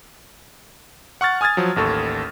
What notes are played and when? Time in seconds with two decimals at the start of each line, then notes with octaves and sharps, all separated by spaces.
1.21 F#5 C#6 F6 A6
1.41 G#5 D#6 F6 G#6 A6
1.57 F3 F#3
1.76 A1 D#2 A4 C#6